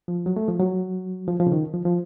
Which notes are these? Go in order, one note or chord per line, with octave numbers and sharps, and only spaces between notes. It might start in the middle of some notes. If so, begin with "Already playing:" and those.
F3
F#3
A3
F3
F#3
F3
F3
C#3
D#3
F3
F3